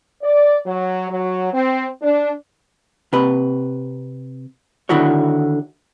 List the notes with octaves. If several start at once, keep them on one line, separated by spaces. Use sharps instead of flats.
D5
F#3
F#3
C4
D4
C3 B4
D3 D#3 E4 F#4 C#5